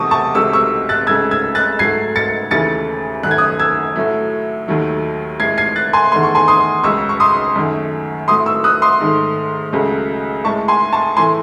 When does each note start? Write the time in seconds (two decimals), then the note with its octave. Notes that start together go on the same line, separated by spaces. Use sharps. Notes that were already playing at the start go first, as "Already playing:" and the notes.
Already playing: E2 C3 F#3 A3 A5 C#6 D#6
0.11 A5 C#6
0.35 C#2 C3 F#3 A3 C#6 E6
0.53 C#6 E6
0.89 F#6 A6
1.07 C#2 C#3 F#3 A3 E6 G#6
1.31 E6 G#6
1.55 F#6 A6
1.79 G#2 F#3 A3 G#6 C7
2.16 A6 C#7
2.51 D#2 C#3 E3 A3 A6 C#7
3.23 F#2 D#3 A3 F#6
3.31 G#6
3.38 D#6 F#6
3.59 E6 G#6
3.96 A2 F#3 A3
4.68 D#2 D#3 F#3 A3
5.40 A2 G#3 G#6 C7
5.58 G#6 C7
5.76 F#6 A6
5.93 G#5 C6
6.12 E2 D#3 A3 C6
6.23 C#6
6.35 G#5 C6
6.48 C6 D#6
6.84 C#2 C#3 F#3 C#6 E6
7.09 C#6
7.20 C6 D#6
7.56 F#2 D#3 A3
8.28 A2 F#3 A3 C6 D#6
8.46 C#6 E6
8.64 D#6 F#6
8.82 C6 D#6
9.00 G#2 D#3 A3
9.72 C#2 C#3 F#3 A3
10.44 A2 G#3 A5 C#6
10.68 G#5 C6
10.92 A5 C#6
11.16 A2 E3 A3 G#5 C6